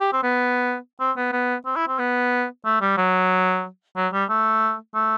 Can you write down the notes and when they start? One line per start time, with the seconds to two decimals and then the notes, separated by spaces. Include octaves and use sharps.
0.01 G4
0.13 C4
0.23 B3
1.00 C4
1.17 B3
1.32 B3
1.66 C4
1.76 E4
1.88 C4
1.99 B3
2.65 A3
2.81 G3
2.97 F#3
3.96 F#3
4.13 G3
4.30 A3
4.95 A3